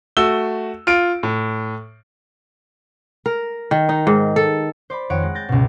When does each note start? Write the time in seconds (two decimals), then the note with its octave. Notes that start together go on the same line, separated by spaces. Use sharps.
0.17 A3 F#4 E6 G7
0.87 F4 D7
1.23 A2
3.26 A#4
3.71 D#3
3.89 D#4
4.07 G#2
4.36 A4
4.90 C5 D5 B5
5.10 F2 D#3 C#5 F#5 D7
5.22 G#3
5.35 G6 A6 A#6
5.49 C#2 G2 B2